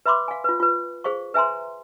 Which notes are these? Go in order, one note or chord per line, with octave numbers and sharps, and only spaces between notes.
B4 E5 B5 C6 D6
F5 G#5
F4 B4
F4 B4
G#4 C5 F5 C#6
B4 E5 G#5 A#5 C6